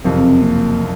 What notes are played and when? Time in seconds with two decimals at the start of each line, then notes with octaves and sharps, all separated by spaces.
0.04 F#1 F2 C3 C4
0.42 A#3